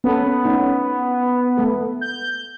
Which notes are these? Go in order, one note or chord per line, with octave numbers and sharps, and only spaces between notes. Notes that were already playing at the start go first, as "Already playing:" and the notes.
B3 C#4 A4
A3 C#4 D#4
A3 A4
G6